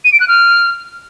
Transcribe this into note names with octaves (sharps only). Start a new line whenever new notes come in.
D#7
D7
F#6
F6